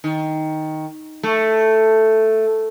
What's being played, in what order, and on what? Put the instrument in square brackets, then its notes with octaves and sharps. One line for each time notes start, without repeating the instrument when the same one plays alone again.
[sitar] D#3
A3